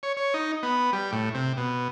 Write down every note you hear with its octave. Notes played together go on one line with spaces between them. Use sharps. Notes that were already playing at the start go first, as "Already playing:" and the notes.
C#5
C#5
D#4
B3
G3
A2
C3
B2